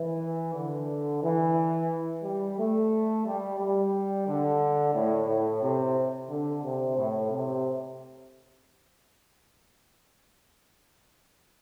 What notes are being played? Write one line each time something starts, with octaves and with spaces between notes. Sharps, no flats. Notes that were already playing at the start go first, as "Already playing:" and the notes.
Already playing: E3
D3
E3
G3
A3
G3
G3
D3
A2
A2
C3
D3
C3
A2
C3